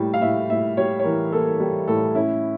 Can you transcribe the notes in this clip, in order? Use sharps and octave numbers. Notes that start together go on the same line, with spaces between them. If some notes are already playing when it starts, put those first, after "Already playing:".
Already playing: A2 G3 A#3
F5
A2 E5
A2 E5
G3 C#5
C#5
E3 A#4
A#3 A4
G3
A2 A4
C#4 E4